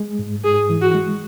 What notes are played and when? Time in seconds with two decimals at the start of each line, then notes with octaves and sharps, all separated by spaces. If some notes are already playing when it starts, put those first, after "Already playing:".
Already playing: G#3
0.19 G#2
0.44 G#2 G#4
0.70 E3
0.82 F#4
0.95 G#3